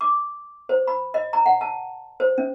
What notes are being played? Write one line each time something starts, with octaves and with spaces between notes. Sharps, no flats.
D6
C5
B5
D#5
A#5
F#5
A5
C5
C#4